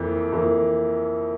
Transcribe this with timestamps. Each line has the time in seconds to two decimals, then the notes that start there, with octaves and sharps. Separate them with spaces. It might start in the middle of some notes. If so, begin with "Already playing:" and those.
Already playing: F2 E3 A#3
0.33 F2 E3 A#3